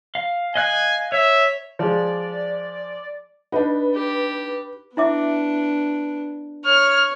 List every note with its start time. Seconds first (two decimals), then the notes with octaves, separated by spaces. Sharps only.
0.15 F5
0.55 D#5 F5 G#5 F#6
1.12 C#5 E5
1.79 F3 G#3 D5
3.52 D4 D#4 B4
3.94 G4
4.97 B3 D4 E4 E5 D6
6.65 C#5 F6